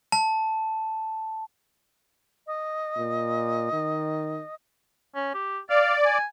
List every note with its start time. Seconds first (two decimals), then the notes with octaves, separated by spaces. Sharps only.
0.12 A5
2.47 D#5
2.97 A#2
3.72 D#3
5.15 C#4
5.34 G4
5.70 D5 F5
6.05 G#5